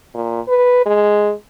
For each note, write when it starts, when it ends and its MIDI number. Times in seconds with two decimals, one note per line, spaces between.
0.14 0.41 46
0.48 0.84 71
0.86 1.33 56